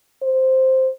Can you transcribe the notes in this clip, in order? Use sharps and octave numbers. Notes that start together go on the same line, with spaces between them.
C5